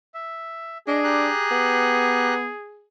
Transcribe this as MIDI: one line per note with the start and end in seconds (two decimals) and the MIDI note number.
0.14 0.78 76
0.88 1.30 62
0.88 2.85 68
0.88 0.99 75
1.04 2.34 67
1.04 2.34 82
1.04 2.34 90
1.51 2.51 59